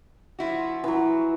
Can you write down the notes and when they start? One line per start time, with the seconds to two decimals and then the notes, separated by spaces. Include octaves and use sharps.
0.39 F3 E4 F#4
0.84 E3 F#3